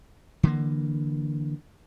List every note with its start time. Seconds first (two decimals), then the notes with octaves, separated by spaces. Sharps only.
0.43 D3 E3 A#3